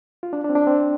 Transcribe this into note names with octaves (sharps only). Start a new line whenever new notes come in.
F4
D4
D4
C4
D4
C4